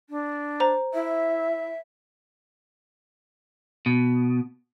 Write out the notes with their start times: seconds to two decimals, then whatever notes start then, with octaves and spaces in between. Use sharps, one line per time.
0.10 D4
0.60 C5 A#5
0.93 E4 E5
3.86 B2